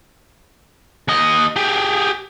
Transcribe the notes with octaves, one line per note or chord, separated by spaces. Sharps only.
D#2 D#5
G4 G#4